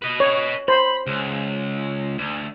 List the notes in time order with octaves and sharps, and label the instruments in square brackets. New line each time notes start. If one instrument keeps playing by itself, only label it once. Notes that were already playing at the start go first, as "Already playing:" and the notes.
[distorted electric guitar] B4 D#5
[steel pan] C#5
[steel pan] C5 [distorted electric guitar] B5
[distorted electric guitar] C#2
D2